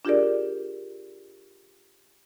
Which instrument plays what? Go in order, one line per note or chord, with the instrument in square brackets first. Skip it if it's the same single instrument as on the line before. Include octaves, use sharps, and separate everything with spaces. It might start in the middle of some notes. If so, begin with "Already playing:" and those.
[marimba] D4 F4 G4 G#4 A#4 D5